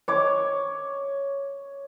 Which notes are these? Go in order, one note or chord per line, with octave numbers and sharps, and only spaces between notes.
C#5 D6